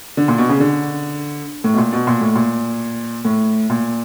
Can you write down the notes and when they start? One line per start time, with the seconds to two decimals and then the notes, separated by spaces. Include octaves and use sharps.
0.17 D3
0.28 A#2
0.38 B2
0.49 C#3
0.60 D3
1.64 A2
1.74 B2
1.78 A#2
1.93 B2
2.07 A#2
2.21 A2
2.35 A#2
3.25 A2
3.70 A#2